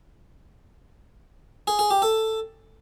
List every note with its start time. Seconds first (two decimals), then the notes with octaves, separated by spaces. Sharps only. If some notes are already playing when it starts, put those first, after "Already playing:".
1.67 G#4
1.79 G#4
1.91 G4
2.02 A4